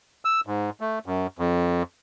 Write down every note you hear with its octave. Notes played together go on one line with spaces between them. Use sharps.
E6
G#2
A3
F#2
F2